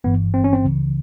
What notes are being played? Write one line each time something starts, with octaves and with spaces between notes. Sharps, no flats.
G1 G2 E3 B3
C4
C#4
C4
C#2 C#3 E3